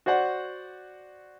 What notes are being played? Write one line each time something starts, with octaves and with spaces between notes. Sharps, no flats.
F#4 C5 D5 F#5